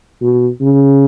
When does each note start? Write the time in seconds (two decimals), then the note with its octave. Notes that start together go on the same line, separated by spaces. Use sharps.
0.21 B2
0.60 C#3